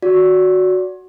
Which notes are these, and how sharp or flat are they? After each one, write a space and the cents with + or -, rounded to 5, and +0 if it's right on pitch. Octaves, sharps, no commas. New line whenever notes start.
F#4 -5 D5 -30